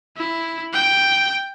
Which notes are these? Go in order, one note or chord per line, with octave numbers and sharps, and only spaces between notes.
E4
G5